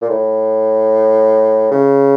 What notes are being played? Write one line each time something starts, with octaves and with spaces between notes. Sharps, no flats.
A#2
A2
C#3